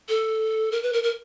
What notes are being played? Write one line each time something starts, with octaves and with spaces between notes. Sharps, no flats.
A4
A#4
B4
A#4
A#4